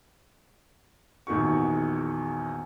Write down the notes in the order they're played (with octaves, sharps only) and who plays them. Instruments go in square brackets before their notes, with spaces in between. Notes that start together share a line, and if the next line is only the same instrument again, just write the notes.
[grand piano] A#1 E2 D#3 F#4 C#6